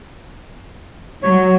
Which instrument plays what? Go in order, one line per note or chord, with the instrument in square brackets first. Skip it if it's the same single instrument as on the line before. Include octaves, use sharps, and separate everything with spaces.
[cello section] F#3 [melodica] C#5